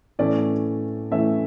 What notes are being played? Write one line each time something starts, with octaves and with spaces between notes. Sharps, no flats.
A2 E3 A3 C#4 D5
A2 E3 A3 C#4 E5